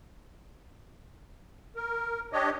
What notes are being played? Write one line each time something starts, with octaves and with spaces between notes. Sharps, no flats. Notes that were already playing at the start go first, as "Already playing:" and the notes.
A#4
D4 G4 C#5 D#5